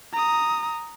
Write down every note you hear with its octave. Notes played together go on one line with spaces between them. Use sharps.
A#5 D#6